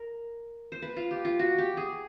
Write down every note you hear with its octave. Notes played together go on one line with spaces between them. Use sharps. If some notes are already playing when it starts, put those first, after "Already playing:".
Already playing: A#4
C5
B4
F4
G4
F4
F#4
G4
G#4